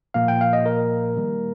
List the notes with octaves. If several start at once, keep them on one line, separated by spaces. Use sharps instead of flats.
A#2 F3 A#3 F5
G5
F5
D#5
A#4
D#3 G3 A#3